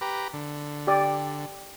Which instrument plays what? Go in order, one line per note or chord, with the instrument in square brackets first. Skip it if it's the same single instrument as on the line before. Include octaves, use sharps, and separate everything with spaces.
[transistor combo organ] G4 B4 A#5
D3
[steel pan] G4 D5